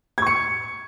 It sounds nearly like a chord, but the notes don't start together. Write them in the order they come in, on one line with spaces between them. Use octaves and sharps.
G#6 C#6 C#7